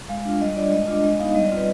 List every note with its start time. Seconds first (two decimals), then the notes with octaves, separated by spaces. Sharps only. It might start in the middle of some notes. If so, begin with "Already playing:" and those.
0.09 G#3 F5
0.25 D4 F4
0.40 G3 D#5
0.56 D4 F4 D5
0.72 G#3 D#5
0.88 D4 F4
1.04 G#3 D#5
1.19 B3 D#4 F5
1.35 G3 D#5
1.46 D5
1.51 C4 F4
1.57 B4